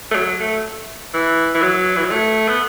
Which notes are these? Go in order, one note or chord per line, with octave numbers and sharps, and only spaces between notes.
A3
F#3
A3
E3
E3
F#3
E3
F#3
A3
B3